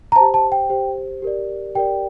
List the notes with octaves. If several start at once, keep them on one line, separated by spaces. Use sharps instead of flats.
A#5
G4 C5 A5
A5
G5
G4 C5
G4 A#4 D5
G4 A#4 D5 G5